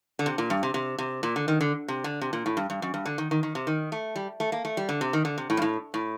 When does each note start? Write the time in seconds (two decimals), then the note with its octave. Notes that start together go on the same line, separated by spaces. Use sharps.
0.19 D3
0.26 C3
0.38 A#2
0.50 G2
0.63 C3
0.74 C3
0.98 C3
1.23 A#2
1.36 D3
1.48 D#3
1.61 D3
1.88 C3
2.04 D3
2.21 C3
2.33 A#2
2.46 A2
2.57 G2
2.70 G2
2.82 F#2
2.94 G2
3.06 D3
3.18 D#3
3.31 D#3
3.43 D#3
3.55 C3
3.67 D#3
3.92 A3
4.16 G3
4.40 A3
4.52 A#3
4.65 A3
4.77 G3
4.89 D3
5.01 C3
5.13 D#3
5.25 D3
5.38 C3
5.50 A2
5.57 G2
5.62 A2
5.94 A2